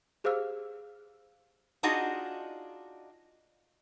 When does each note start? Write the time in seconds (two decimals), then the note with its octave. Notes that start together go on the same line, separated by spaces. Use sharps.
0.24 G4 G#4 C5 F5 E6 F6
1.83 D4 D#4 F4 F#4 G#4 D#5